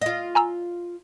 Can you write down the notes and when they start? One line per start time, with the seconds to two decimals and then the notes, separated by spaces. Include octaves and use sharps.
0.01 F4 D#5
0.35 G#5 A#5 E6